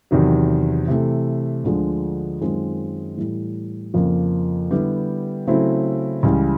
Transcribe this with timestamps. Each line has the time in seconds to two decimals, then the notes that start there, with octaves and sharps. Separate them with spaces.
0.11 E2 C3 D#3 F#3
0.88 C3 E3 A3
1.64 D2 D3 F3 G#3
2.41 F#2 D#3 G#3 C4 F4
3.17 A2 E3 G3
3.94 F2 C#3 F3 A#3
4.71 D3 G3 B3 E4 G4
5.47 C#3 F#3 A3 C4 E4
6.23 C#2 C#3 E3 G3